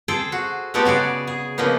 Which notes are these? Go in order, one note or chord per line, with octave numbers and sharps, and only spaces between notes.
G#4 A4 C5 G5
F#4
G#3 A3 B3 F#4 G4 A4
C#3 F#4 G#4 D5
G#4
C#3 F3 A#3 B3 D#4